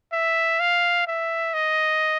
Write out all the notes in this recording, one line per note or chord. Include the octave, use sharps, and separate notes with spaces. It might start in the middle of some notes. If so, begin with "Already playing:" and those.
E5
F5
E5
D#5